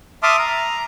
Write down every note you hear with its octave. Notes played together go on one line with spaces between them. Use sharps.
E5 A5 C6 D6 D#6 F6
A#5